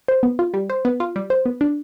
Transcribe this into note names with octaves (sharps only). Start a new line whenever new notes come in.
C5
B3
F4
G3
C5
B3
F4
G3
C5
B3
D4